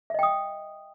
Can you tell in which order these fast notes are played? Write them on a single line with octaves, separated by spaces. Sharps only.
E5 D#5 G5 D#6